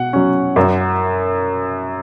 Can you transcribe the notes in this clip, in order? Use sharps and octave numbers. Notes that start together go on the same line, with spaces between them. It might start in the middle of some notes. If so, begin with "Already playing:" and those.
Already playing: B2 F#5
F#3 C#4
F#2